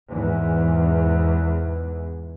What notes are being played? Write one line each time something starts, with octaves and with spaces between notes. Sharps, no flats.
E2 G#2